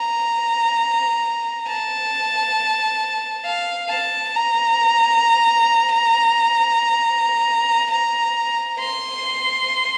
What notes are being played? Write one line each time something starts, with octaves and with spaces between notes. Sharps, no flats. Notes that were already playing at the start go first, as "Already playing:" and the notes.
Already playing: A#5
A5
F5
A5
A#5
A#5
C6